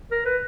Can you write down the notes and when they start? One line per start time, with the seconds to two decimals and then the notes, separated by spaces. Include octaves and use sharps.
0.11 A#4
0.26 B4